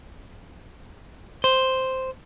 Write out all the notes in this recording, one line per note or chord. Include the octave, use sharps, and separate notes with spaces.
C5